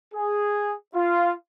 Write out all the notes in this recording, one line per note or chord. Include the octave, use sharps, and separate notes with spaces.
G#4
F4